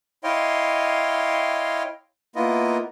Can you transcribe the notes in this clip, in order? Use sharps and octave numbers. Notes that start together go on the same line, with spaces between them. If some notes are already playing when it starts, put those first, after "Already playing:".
E4 C#5 D#5 F5 G5 C6
A#3 B3 E4 F4 A#4 D#5